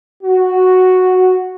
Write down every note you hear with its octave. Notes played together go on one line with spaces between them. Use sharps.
F#4